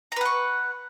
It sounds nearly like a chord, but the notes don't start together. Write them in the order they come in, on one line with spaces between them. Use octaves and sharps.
A#5 B4 F#5 C#6